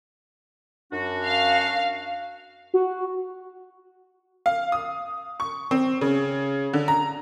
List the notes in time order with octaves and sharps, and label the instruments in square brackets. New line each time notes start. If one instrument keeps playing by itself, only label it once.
[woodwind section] F#2 D4 F#4
[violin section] F5
[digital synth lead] F#4
[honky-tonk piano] F5
D#6
C#6
C4
C#3
D3
A#5